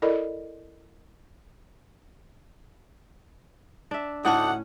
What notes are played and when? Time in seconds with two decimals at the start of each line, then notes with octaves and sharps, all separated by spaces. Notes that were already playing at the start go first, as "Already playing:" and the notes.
0.02 E4 A4 A#4 D5 D#5
3.91 D4 E5
4.25 D2 A2 C#4 D#4 F#5 A5 D6 D#6